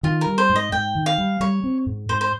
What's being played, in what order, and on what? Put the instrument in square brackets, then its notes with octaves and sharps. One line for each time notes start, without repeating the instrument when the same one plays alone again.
[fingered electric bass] D#3 [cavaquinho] F4
[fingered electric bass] G3 [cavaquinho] A#4
[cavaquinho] C5
[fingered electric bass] G#2
[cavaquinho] D#5
[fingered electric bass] G#2 [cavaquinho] G5
[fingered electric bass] D#3
[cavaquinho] F5
[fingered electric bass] G3
[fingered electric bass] G3 [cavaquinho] C#5
[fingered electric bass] C4
G#2
[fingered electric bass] G#2 [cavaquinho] C5
[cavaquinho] C5